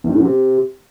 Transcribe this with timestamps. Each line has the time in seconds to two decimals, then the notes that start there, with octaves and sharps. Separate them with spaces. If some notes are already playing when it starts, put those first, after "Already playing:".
0.04 E2
0.09 G2
0.15 A2
0.20 F#2
0.25 C3